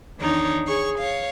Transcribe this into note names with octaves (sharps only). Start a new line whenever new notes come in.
E2 D#3 D4 D#4 C#5 A#5
G#4 C#5 C#6
C#5 F5